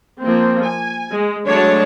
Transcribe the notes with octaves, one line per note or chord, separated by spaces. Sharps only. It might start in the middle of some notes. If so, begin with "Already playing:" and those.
F3 A#3 C4
G#5
G#3
F#3 G#3 A3 D4 C#5